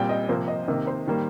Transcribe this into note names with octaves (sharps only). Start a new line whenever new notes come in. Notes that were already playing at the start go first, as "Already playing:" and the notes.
Already playing: A#2 G3 C4 G5
D#5
C3 F3 A#3 C5
D#5
C3 D#3 A#3 D#5
C5
D#3 G3 A#3